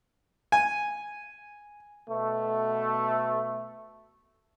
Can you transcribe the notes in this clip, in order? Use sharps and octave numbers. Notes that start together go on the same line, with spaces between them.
G#5
B2 A3